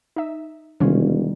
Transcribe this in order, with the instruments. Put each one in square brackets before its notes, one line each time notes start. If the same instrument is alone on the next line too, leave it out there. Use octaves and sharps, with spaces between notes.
[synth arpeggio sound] D#4 E5
[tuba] E1 [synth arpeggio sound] C3 C#4 F4 [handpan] D#3 G3 A#3